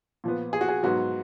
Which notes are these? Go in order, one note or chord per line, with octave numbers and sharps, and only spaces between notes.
A#2 F3 B3
G#4
F#4
G#4
G#2 F#3 B3 F#4